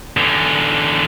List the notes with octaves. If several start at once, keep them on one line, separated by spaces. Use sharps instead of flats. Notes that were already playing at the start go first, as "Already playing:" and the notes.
E2 D3